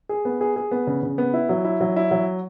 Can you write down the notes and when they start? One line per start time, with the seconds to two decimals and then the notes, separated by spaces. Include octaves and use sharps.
0.09 G#4
0.25 B3
0.41 G#4
0.56 G#4
0.71 B3
0.87 C#3
1.03 C#3
1.18 B3
1.34 E4
1.49 F#3
1.65 E4
1.81 F#3
1.96 E4
2.11 F#3